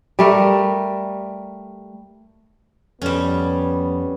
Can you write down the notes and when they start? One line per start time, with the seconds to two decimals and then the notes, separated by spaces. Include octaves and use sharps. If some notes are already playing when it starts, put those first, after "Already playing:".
0.19 G3 A3 A#4
3.02 F2 G3 B3 C#4